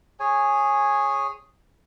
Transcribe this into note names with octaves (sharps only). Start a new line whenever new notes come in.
G#4 C#5 G#5